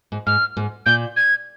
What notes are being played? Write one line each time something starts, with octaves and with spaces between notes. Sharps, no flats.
G#2
G#2 F6
G#2
A#2 G6
G#6